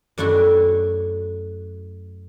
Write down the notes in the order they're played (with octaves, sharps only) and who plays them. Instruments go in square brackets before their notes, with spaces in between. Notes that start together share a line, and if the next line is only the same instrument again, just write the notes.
[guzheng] F#2 A3 D4 E4 F#4